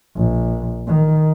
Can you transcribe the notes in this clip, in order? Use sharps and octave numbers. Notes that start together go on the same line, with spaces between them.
A#1
D#3